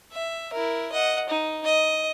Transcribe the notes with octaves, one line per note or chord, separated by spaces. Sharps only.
E5
E4 A#4
D#5 F#5
D#4
D#5